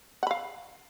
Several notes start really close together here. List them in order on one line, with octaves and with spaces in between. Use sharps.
F#5 B5 F5